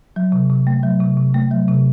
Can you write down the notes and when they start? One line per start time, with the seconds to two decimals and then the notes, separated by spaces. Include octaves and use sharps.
0.16 F#3
0.32 C3
0.50 C3
0.67 A3
0.83 F#3
1.00 C3
1.17 C3
1.34 A3
1.51 F#3
1.69 C3